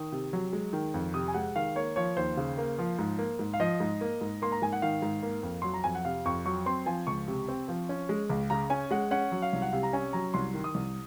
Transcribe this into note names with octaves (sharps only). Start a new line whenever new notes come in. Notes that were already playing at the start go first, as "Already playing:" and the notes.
Already playing: D#3 D#6
C3
F#3
G#3
D#3
F2
C3 D#6
G#5
G#3 F#5
D#3 F5
A#3 C#5
F3 C#5
D#2 C5
C#3
A#3
F3
G#2
A#3
G#2
F5
F3 D#5
G#2
A#3
G#2
A#3 C6
A#5
G#2 G#5
F#5
D#3 F5
G#2
A#3
F2
F#3 C6
A#5
F2 G#5
F#5
C3 F5
F2 C#6
F#3 C#6
C4 C6
F3 G#5
C#2 C#6
C3
C4
F3
C#4
G#3
C#2
C#3 A#5
C#4 G#5
G#3 F#5
C#4 F#5
F#3
F5
C2
F#5
C3 F5
A#5
C#4 G#5
F#3 A#5
C2 C6
D#3
D#6
C2